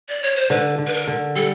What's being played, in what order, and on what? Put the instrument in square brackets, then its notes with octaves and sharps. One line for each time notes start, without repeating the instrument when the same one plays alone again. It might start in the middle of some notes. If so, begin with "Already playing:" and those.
[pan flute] D5
C#5
C5
[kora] D3 [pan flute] B4
[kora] D3
[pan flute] B4
A#4
[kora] D3
[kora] G3 [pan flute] A4